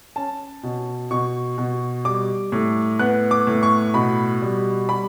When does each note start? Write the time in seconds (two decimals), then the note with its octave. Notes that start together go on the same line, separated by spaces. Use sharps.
0.16 C#4 A5
0.63 B2
1.11 B2 C#6
1.58 B2
2.05 G3 D6
2.52 A2
2.99 B3 F#6
3.31 D6
3.47 A2
3.63 C#6
3.94 B2 B5
4.42 G3
4.89 G3 B5